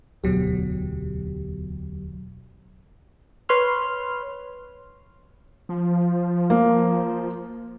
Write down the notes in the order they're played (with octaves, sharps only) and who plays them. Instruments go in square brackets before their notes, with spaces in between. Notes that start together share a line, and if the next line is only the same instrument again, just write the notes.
[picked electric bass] E1 D2 [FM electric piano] B2 F#3 G4
[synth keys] B4 C#5 C6 F6
[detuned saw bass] F3
[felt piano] A#3